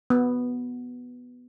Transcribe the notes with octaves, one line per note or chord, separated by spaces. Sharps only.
B3